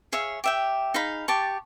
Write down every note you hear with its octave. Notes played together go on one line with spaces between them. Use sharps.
G#4 C#5 E5 F5
G4 E5 G5
D#4 G#4 F5 B5
G4 G5 A5 C#6